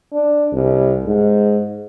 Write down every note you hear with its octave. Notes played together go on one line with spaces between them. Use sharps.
D4
C2
G#2